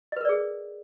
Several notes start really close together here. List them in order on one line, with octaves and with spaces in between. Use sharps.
D#5 B4 A#4 D5 G#4